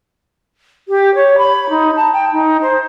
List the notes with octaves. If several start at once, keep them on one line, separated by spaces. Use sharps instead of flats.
G4
C#5
B5
D#4
A5
G5
D#4
C5